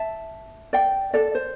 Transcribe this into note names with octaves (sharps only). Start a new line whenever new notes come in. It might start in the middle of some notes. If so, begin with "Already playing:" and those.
Already playing: E5 A5
D5 G5
A4 D5
C5